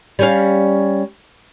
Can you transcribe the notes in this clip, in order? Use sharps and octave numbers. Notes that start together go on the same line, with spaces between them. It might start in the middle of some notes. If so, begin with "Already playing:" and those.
G3 C#4 F5